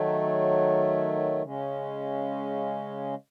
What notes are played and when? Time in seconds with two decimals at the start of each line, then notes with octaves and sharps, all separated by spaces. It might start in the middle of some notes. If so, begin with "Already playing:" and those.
Already playing: D#3 F#3 A3
1.42 C#3 G#3 C#4